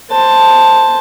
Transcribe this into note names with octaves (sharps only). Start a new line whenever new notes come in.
C5 A5